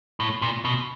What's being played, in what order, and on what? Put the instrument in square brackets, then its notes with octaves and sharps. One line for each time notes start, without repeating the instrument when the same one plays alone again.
[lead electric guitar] A2
A#2
B2